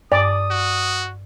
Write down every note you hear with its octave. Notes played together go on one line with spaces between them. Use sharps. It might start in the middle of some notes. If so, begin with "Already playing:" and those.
G2 D5 D#6
F#4